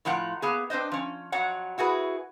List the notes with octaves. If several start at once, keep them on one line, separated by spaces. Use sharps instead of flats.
A2 F3 F4 F#5 A#5
A#3 B3 G#4
C4 D4 B4 C5 D#5
F3 C#4
F2 F#3 C#5 F#5
E4 F#4 G#4 B4